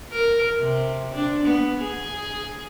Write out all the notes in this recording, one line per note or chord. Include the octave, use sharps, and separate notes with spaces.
A#4
C3
D4
B3
G#4